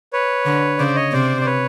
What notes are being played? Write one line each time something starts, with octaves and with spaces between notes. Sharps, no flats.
B4 C#5
D3
C#3 C5 D5
C#5 D#5
C3 C5 D5
D5
B4 C#5